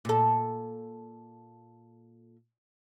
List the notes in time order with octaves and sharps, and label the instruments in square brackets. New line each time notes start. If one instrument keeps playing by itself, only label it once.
[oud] A#2 A4